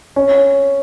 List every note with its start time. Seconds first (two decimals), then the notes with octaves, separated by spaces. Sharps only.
0.16 C#4